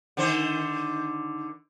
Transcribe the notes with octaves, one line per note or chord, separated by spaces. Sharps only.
D3 D#3 C5